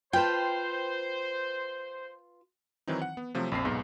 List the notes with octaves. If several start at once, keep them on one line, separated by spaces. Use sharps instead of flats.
F4 B4 C5 G5 A5
D#3 E3 F#3 C4 D#4
F#5
B3
C3 F3 F#3 A3 C4
A#1 F2 C4 C7
B1 G#2 G#3 B3